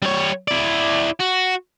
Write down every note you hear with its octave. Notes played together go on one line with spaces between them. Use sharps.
G3 C#5
E4 D5
F#4